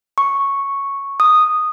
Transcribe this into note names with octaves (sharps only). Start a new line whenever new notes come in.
C#6
D#6